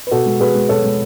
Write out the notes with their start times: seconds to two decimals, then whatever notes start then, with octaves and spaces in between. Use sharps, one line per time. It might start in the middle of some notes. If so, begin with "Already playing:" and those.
0.07 B4
0.11 B2 F#4 A4
0.26 G#3
0.40 B2 G#4 B4
0.55 G#3
0.69 B2 A4 C#5
0.84 G#3